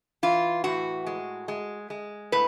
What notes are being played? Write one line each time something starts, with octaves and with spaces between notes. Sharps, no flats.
E3 F4
A2 F#4
G#3
G#3
G#3
A2 B4